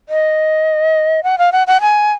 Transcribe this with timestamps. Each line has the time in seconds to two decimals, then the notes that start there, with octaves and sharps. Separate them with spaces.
0.09 D#5
1.23 F#5
1.38 F5
1.52 F#5
1.67 F#5
1.81 G#5